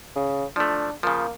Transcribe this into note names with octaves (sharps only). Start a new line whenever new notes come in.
C#3
F3 A3 D4
C#3 F3 A#3